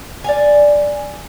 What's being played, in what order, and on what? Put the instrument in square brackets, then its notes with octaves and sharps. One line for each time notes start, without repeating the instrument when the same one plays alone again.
[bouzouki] D5 F5 G#5